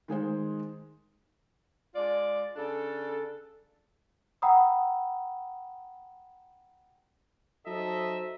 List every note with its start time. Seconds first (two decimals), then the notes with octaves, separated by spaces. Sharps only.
0.08 D#3 G#3 G#4 C5
1.95 G#3 F4 D5
2.56 C#3 D4 A4
4.42 F#5 G5 A#5 B5 D#6 E6
7.67 F#3 D#4 A4 C5 D#5 E5